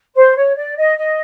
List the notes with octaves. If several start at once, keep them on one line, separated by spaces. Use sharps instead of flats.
C5
C#5
D5
D#5
D#5